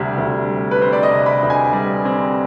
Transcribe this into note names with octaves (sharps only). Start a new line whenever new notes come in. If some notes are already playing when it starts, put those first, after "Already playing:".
Already playing: D2 C3 G3 C4
D2
G3
B4
C4 C5
D5
D#5
C3
B5
D2
G#5
G3
C4